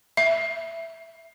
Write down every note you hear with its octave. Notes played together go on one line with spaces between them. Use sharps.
E5